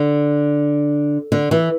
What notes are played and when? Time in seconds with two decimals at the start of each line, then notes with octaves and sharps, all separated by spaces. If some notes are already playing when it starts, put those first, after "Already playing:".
Already playing: D3
1.32 D3
1.51 E3